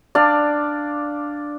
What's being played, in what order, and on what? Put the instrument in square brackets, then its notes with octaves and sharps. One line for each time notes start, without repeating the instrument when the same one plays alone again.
[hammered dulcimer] D4 [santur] D5 F5